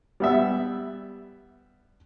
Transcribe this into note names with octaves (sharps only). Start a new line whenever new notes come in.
G3 B3 E5